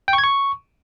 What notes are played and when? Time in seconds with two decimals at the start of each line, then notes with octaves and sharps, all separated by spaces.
0.08 G5
0.13 C#6
0.18 G#6
0.24 C#6